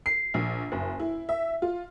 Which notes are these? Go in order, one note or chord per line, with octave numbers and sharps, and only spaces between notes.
C7
A#1
F#1
E4
E5
F4